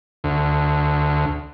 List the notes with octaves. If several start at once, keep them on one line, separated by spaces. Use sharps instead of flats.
D2